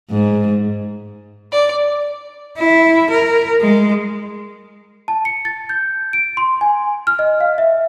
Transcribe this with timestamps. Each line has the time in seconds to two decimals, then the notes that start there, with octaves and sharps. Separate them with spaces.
0.10 G#2
1.52 D5
2.58 E4
3.10 A#4
3.61 G#3
5.08 A5
5.25 C#7
5.45 A6
5.69 G6
6.13 D7
6.37 C6
6.61 G#5
7.07 F6
7.19 D#5
7.40 F5
7.58 E5